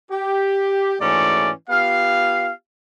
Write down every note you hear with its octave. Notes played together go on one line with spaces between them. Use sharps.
G4
G#2 E3 A3 C#4 F#4 D5
B3 F4 G4 F5